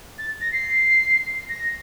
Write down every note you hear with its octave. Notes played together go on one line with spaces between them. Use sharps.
A6
A#6
C7
A#6